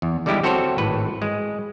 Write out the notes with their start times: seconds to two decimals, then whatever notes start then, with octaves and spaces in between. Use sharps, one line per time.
0.02 E2
0.26 D3 G3 G#3 E4 G4
0.43 C4 F#4 A4 C5 C#5
0.78 G#1 A2 B4
1.22 G#3